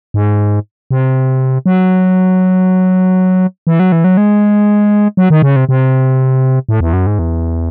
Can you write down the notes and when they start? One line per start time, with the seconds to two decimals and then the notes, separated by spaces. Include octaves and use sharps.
0.14 G#2
0.91 C3
1.66 F#3
3.67 E3
3.80 F#3
3.92 E3
4.04 F#3
4.17 G#3
5.17 F#3
5.30 D#3
5.42 C#3
5.56 C3
5.69 C3
6.69 A2
6.81 E2
6.93 F#2
7.07 G#2
7.19 E2